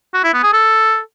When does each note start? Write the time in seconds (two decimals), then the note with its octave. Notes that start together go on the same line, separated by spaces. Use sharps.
0.14 F#4
0.24 E4
0.34 B3
0.43 G#4
0.53 A4